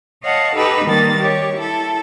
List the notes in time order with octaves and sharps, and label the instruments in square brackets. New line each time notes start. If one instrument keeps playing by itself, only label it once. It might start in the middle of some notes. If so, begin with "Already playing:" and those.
[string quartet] C#5 D#5 F5 F#5 A5
D#4 G4 A4 B4
D#3 G3 A#3 A6
G4 C#5
E4 A4